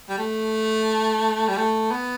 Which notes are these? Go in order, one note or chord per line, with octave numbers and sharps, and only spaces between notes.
G3
A3
G3
A3
B3